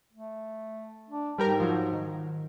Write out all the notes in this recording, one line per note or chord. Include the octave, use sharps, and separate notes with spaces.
A3
D4
G#2 G3 G4 A#4
F3 F#3
D#3